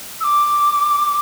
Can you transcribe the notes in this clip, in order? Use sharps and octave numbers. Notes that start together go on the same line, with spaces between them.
E6
D6